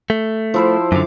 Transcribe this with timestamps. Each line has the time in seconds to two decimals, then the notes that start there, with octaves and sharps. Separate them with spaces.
0.10 A3
0.54 F3 E4 C5
0.92 F#2 D3 D6